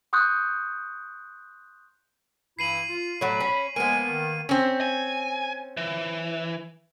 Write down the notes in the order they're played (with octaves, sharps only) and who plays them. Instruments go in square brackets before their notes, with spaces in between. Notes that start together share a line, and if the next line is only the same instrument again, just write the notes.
[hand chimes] C6 C#6 D#6 F#6 G6
[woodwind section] G2 E3 E4 [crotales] C7 D#7 F#7
[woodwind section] F4
[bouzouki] A2 F#3 [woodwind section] B5
[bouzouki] C#4
[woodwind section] F3 G#3 G#5 [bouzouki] A#3 B3 [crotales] D#7
[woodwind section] D#3
[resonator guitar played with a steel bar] C4 C#4
[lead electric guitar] G#5
E3